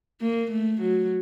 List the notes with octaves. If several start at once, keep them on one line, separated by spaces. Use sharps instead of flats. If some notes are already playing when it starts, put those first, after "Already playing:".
A#3
A3
F#3